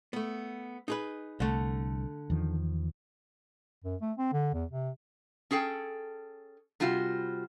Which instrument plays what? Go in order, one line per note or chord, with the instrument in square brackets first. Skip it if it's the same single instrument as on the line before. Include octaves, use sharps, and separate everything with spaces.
[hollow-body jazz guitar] A3 B3
D#4 G#4 B4
[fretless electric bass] C2 [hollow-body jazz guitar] D3 A3
[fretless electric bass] E2 D#3 F3
[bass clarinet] F#2
A3
C4
D3
E2
C3
[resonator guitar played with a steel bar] C#4 G#4 A4 G5
C3 G3 F4 F#4